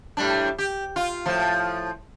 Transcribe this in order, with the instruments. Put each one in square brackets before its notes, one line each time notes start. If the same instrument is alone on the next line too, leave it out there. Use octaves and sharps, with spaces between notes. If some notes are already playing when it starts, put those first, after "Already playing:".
[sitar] A2 G3 D4
G4
F4
A2 F3